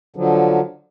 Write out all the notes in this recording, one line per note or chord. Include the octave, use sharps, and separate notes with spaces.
D3 F3 F#3